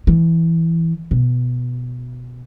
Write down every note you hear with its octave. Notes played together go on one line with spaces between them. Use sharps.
E3
B2